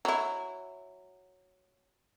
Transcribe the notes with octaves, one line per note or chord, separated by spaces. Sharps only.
F#3 E4